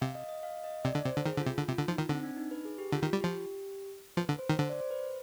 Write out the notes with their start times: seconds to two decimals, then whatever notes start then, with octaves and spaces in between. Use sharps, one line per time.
0.01 C3 F5
0.15 D#5
0.29 D#5
0.43 F5
0.64 D#5
0.84 C3 D5
0.95 D3
1.05 C3 C5
1.16 D3
1.26 D#3 G#4
1.37 D3
1.40 F4
1.46 C3
1.58 D3
1.68 C3 F4
1.78 D3
1.88 F3 D#4
1.98 D#3
2.09 D3 C4
2.23 D4
2.37 D#4
2.51 B4
2.65 G#4
2.78 G4
2.92 D3 F4
3.03 D#3
3.06 F4
3.13 G3
3.21 F3 G4
4.17 F3 B4
4.29 D3
4.39 C5
4.49 D#3
4.59 D3 C5
4.69 D5
4.80 C5
4.91 B4